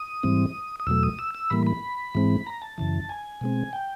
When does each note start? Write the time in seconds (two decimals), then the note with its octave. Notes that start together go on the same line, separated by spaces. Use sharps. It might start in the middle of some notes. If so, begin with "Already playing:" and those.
Already playing: D#6
0.23 G#2 E3 G3 C4
0.80 D#6
0.87 E2 B2 F#3 A3 E6
1.03 D#6
1.19 E6
1.35 E6
1.50 A2 E3 G3 A#3 B5
1.67 B5
2.15 G#2 E3 G#3 C4
2.46 A#5
2.62 A5
2.78 F#2 C#3 E3
3.09 G#5
3.41 B2 G#3 C4
3.73 G5